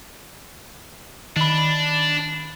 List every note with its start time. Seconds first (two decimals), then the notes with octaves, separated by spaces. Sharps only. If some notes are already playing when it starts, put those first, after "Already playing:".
1.37 D#3 D4 B5